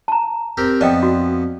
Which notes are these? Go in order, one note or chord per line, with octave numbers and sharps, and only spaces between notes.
A5 A#5
C4 G4 A#4
F2 B3 D5 D#5 G5 A5
F#4